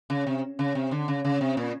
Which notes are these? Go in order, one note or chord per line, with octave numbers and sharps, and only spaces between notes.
C#3
C3
C#3
C3
D3
C#3
C#3
C3
A#2